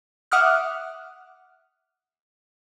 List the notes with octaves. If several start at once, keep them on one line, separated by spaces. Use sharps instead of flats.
E5 F#5 D6 D#6 F6 F#6